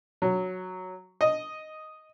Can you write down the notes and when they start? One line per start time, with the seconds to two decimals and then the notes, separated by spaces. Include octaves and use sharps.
0.22 F#3
1.21 D#5